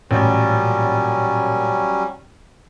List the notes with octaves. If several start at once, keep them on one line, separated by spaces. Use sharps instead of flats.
A1 A#2 F#3 G3 C#4